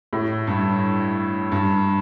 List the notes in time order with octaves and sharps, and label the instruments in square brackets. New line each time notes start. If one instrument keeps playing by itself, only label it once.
[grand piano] A2
G2
G2